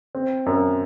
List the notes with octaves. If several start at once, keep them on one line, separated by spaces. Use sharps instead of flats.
C4
F#2